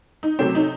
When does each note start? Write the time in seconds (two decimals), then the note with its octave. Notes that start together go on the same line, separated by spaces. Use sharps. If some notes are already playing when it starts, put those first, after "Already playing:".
0.23 D#4
0.39 C3 F#3 A3 C4 C#4
0.55 D#4